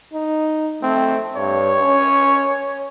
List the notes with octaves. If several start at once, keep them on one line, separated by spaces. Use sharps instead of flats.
D#4
A3 C4
G2 C#5
C#4